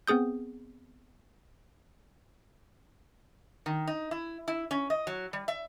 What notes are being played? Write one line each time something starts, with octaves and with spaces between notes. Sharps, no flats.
B3 C4 G#4 D#6 G6
D#3
D#4
E4
E4
C#4
D#5
F#3
G3
E5